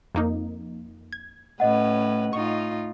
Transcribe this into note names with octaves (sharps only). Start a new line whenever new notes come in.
F2 A#3 D#4
G#6
A2 C#4 B4 D#5 F#5
A2 D#4 F4 C#6